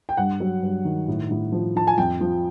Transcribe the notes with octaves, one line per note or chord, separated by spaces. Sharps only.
G5
G2 F#5
F#3
G2
D#3
A2
A2
F3
F3 A5
G#5
F2 G5
F3